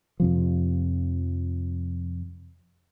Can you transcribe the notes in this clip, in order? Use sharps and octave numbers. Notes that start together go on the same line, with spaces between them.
F2 C3 F3